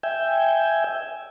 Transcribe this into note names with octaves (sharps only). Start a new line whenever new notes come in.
E5 G5 G#5